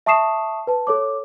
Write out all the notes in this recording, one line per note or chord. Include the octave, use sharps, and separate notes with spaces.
E5 A5 C#6 D#6 C7 E7
B4 A5
A4 C#5 D6